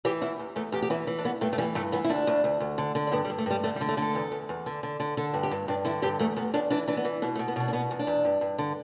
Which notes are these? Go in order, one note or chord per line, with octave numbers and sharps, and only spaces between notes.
E3 G4
E2 E4
E2
E2 A3
E2 G4
G4
E3 E4
E3
D4
G2 B3
G2 A3
A3
E3 G3
G2 A3
E3 B3
E4
D2 D4
D2
D2
D2
D3
D3
D4
G2 B3
G3
G2
A3
G2 G3
D3 A3
G3
D3
A3
D3 A4
E2
E2
E2
D3
D3
D3
D3 A4
G2
G4
G2
G2 D4
D3 E4
G2 G4
E2 A3
E2 B3
E2 D4
E3 D4
E3 D4
B3
E3
B2 B3
A3
B2
B3
B2 D4
D4
B2 B3
E2
D4
E2
G2
G2
D3